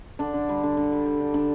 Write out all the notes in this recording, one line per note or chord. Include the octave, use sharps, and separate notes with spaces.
D3 D4
D3
G3
D3
D3
G3
G3
D3
D3 D4